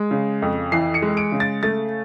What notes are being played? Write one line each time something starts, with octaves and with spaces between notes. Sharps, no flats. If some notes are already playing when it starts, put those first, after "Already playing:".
Already playing: G#3
C#3
F2
E3 C7
C#7
G#3
D7
C#3
A6
A3 A6